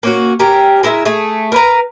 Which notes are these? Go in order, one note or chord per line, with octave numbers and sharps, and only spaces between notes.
A#3 C#4 F#4
C#4 G4 A#4
G#3 E4 A#4 E5
A3 G#4
A#4 B4 A#5